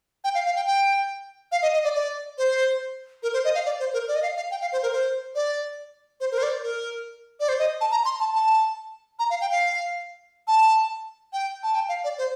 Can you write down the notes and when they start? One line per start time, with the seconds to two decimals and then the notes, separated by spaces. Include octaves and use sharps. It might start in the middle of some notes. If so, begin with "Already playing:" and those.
0.24 G5
0.35 F5
0.46 F5
0.56 G5
0.67 G5
1.52 F5
1.62 D#5
1.73 D#5
1.84 D5
1.95 D5
2.38 C5
3.23 A#4
3.33 C5
3.45 D#5
3.55 F5
3.65 D5
3.80 C5
3.93 A#4
4.08 D5
4.15 D#5
4.22 F5
4.36 F5
4.51 G5
4.61 F5
4.72 C5
4.83 A#4
4.93 C5
5.35 D5
6.20 C5
6.32 A#4
6.38 C5
6.43 D5
6.63 A#4
7.40 D5
7.49 C5
7.59 D#5
7.81 A5
7.92 A#5
8.05 C6
8.20 A5
8.35 A5
9.19 A#5
9.30 F5
9.41 G5
9.51 F5
10.48 A5
11.33 G5
11.63 A5
11.75 G5
11.89 F5
12.04 D5
12.18 C5